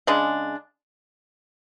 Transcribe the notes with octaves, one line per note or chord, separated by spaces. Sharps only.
C#3 G#3 D4